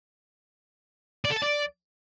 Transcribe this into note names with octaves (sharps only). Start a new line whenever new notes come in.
D5
A4
A5
D5